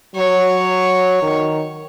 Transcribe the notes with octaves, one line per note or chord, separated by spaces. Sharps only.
F#3 C#5
D#3